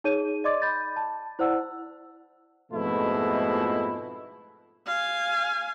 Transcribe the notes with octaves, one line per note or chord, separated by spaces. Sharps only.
D#4 G#4 C#5 D#7
D5 D#5 C6 D6 G#6 A6
B5 G6 A6
A5
E4 C5 D5 F#5 E6
F2 G#2 B2 F3 A3 E4
F5 G#5